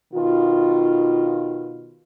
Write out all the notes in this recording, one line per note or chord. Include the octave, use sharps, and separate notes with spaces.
B2 D#3 F4